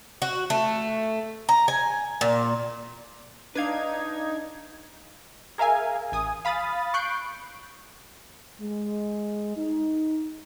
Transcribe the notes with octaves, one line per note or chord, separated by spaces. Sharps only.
F#4
A3
A#5
G#5
A#2
D4 D#4 B4 F5 G#6
G#4 A#4 E5 F5 G#5
A1 G#5 D#6
F5 B5 D#6 A6
C#6 F#6 G6 C7 D7
G#3
D#4